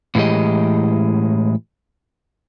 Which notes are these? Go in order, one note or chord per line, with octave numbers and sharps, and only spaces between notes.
A2 E3 G#3 G4 D#5